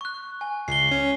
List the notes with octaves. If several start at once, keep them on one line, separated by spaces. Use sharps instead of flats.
C#6 F#6
G#5
C#2 C7 G7
C#4